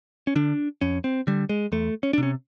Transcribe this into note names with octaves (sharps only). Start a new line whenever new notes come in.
C#4
D3 D4
F2 C#4
C4
D3 G3
G#3
E2 A3
C#4
D4
C3 C#4